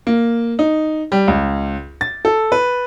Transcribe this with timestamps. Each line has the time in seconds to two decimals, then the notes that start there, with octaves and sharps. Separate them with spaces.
0.07 A#3
0.59 D#4
1.12 G3
1.28 C#2
2.01 A6
2.25 A4
2.52 B4